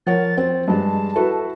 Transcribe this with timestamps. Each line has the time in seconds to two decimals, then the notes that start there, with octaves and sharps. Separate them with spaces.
0.07 F3 A#4 C#5 F#5 A6
0.37 C4
0.68 G2 G#3 A5
1.16 E4 F#4 A4 B4